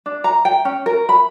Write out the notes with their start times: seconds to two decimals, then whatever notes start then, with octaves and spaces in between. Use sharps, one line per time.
0.06 D4
0.24 A#5
0.45 G5
0.65 C#4
0.86 A#4
1.09 B5